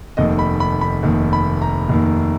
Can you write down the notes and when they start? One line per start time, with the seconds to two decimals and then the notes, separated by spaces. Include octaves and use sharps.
0.17 F1 D#2 D#3 D#5
0.39 B5
0.60 B5
0.81 B5
1.03 F1 D#2 D#3
1.33 B5
1.62 A#5
1.89 F1 D#2 D#3